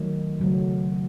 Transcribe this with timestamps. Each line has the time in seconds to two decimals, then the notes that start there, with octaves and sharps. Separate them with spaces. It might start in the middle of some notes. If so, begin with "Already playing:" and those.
Already playing: D#3 F#3 A3
0.40 C#3 F#3 A3